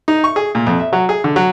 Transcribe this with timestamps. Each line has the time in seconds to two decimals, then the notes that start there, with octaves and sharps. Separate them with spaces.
0.08 D#4
0.24 C#6
0.36 G#4
0.55 A#2
0.67 F2
0.80 E5
0.93 F#3
1.09 G#4
1.24 D3
1.36 F#3